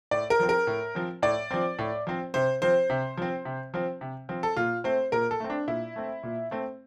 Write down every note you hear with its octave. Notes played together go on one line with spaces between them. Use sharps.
A2 D5
A#4
F3 C4
A#4
A2
F3 C4
A2 D5
F3 C4
A2
F3 C4
C3 C5
F3 C4 C5
C3
F3 C4
C3
F3 C4
C3
F3 C4
A4
A#2 F4
A3 C4 C5
A#2 A#4
A4
A3 C4
D4
A#2 E4
A3 C4
A#2
A3 C4